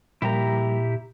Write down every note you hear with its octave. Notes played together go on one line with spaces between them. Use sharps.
A#2 F3 G3 A#3 E4 G4 A#5